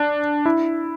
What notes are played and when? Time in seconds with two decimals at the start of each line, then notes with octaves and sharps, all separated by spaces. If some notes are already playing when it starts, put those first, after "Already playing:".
Already playing: D4
0.46 E4